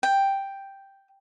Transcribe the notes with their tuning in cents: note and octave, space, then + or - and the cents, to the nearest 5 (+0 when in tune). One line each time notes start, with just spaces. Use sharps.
G5 +0